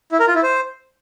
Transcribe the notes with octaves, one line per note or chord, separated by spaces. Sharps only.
E4
A#4
F4
E4
C5